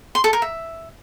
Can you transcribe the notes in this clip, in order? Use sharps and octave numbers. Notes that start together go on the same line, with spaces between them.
C6
A4
A#4
E5